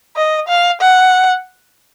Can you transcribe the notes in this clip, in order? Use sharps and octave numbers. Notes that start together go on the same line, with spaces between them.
D#5
F5
F#5